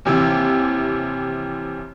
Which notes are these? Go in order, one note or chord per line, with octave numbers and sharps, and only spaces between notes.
D#2 C3 E3 E6